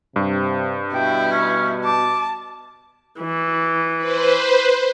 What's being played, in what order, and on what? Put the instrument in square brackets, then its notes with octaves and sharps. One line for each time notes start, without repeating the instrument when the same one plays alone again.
[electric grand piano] G2 [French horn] C3
[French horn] B2 [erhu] E4 [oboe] G5
[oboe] C#4
[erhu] A5 [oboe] D6
[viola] E3
[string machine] B4 C5